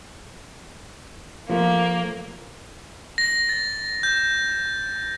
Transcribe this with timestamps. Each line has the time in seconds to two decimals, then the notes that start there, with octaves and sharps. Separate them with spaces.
1.50 F3 A3 A#3
3.18 A#6
3.49 A6
4.03 G6